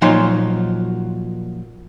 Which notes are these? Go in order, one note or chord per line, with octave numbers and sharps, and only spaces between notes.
A#2 F3 F#3 D#4 C6